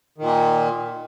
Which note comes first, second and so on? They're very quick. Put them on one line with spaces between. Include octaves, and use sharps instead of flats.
D#3 A#2 A#3